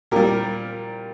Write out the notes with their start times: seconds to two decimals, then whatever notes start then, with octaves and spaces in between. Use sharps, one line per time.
0.11 A#2 G3 G4 A#4